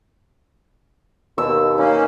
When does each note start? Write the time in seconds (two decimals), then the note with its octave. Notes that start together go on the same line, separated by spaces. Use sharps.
1.38 D#2 B2 E6
1.78 A#3 C#4 D#4